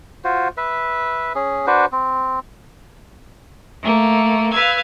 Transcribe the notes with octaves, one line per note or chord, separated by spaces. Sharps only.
F4 F#4 C5
B4 E5
C#4 G#4
D4 F#4 B4 C5
C4
A3 A#3
B4 F5 E6 G#6